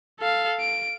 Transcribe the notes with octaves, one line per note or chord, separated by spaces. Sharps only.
A4 F5
D7